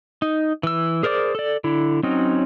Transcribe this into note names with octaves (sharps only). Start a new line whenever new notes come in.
D#4
E3 E6
G#4 A#4 C5 D5 D6
A4 D5
D3 E4
F#3 C4 C#4 D#4